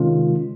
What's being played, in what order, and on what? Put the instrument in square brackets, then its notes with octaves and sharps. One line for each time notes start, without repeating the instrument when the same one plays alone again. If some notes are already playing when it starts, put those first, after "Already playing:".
Already playing: [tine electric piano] C3 D#3 G#3 C#4 F4